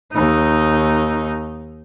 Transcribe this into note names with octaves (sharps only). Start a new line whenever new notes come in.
D#2 D#4